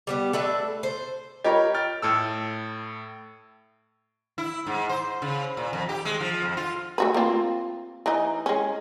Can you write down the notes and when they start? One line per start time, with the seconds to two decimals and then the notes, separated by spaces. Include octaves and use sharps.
0.07 G3 B3 G4
0.33 A3 D4 B4 E5
0.83 C5
1.44 F4 G4 A#4 C#5 D#5
1.74 G5 F6 A6
2.02 A2 A4 E6
4.38 E4
4.67 G#2
4.89 C5
5.22 C#3
5.57 A#2
5.73 F2
5.89 G4
6.05 G#3
6.21 F3
6.42 F2
6.57 F4
6.98 A3 F#4 B4
7.14 A#3 C4 F4
8.06 E3 D#4
8.46 G#3 C#4